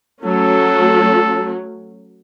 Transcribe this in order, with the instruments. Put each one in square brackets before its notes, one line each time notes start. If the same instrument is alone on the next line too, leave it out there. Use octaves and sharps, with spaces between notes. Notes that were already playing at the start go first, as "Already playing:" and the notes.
[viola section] F#3 A3 C#4 [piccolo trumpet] A4